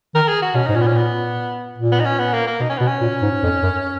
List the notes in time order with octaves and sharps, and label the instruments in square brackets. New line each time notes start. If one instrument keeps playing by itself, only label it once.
[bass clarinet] D#3 [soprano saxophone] A#4
[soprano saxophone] G#4
F#4
[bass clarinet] B2 [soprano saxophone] C#4
[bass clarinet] G#2 [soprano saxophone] D#4
[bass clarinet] A#2 [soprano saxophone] C#4
[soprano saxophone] B3
C#4
B3
[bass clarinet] A#2
[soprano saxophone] B3
D#4
C#4
B3
A#3
A#3
[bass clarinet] B2 [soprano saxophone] D#4
[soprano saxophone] C#4
[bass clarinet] B2 [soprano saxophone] B3
[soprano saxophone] C#4
[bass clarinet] A#2
G#2
F2
F#2